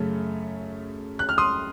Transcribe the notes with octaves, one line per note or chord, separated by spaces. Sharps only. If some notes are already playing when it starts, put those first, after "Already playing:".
Already playing: F#2 C#3 A3 C#4
F#6
F6
C6 D#6